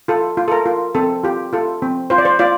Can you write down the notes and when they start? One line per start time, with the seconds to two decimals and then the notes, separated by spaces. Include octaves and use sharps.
0.08 F4 A4
0.37 F4
0.48 A4
0.52 A#4
0.66 F4
0.95 C4 A4
1.23 F4 G4
1.53 F4 A4
1.82 C4
2.10 F4 C5
2.18 D5
2.25 C5
2.39 F4 D5